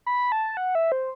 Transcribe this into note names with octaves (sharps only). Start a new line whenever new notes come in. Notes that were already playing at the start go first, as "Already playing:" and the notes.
B5
A5
F#5
E5
C5